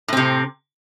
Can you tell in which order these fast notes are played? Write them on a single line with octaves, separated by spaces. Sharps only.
A2 C4 C3